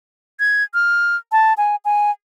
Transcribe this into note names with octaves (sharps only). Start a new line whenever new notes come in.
G#6
F6
A5
G#5
G#5